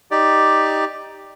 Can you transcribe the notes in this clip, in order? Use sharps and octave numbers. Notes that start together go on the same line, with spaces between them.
D#4 G4 D5